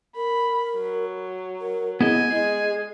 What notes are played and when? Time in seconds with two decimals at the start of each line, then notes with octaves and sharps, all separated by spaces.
0.16 A#4 B5
0.76 F#3
1.61 A#4
2.01 B3 E4 G#4 D#5 G#5
2.30 G#3 G#4 D#5